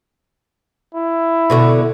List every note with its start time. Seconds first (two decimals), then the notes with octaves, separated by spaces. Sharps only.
0.94 E4
1.50 B2 D3 F#4